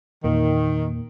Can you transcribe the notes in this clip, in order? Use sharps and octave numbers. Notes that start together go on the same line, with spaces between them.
E2 A#2 D#3 A#3